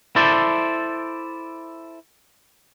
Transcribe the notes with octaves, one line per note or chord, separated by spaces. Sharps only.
E4 A4 C5 D5